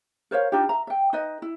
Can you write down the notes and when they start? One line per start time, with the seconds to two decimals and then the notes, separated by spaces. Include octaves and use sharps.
0.31 A#4 C5 C#5 F5
0.52 D4 D#4 F4 G4
0.69 E5 A#5
0.87 E5 G5
1.13 D#4 B4 D#5
1.42 E4